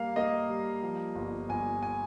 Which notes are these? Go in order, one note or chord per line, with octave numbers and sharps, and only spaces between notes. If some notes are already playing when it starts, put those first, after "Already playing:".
Already playing: G3 A#3 F5
A#3 D#5
G3
F3
G1
G1 G#5
G#5